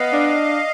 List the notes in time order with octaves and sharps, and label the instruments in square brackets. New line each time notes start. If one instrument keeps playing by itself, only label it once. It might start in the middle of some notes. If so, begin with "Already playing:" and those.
Already playing: [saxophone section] B3 [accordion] D#5 F5
[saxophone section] D4